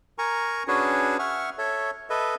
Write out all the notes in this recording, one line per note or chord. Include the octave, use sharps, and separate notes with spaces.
A#4 G#5 A#5 C#6
C#4 D4 F#4 G#4 B4 C#5
E5 F#5 C#6 F6
A4 C#5 E5
A4 B4 D#5 E5